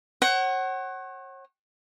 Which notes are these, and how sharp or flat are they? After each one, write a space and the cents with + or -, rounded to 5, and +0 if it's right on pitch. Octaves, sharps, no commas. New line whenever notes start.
C#5 -40 F#5 +25